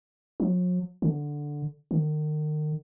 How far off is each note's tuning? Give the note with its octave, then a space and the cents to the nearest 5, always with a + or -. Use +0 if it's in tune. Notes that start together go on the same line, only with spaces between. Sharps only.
F#3 -45
D3 +0
D#3 -35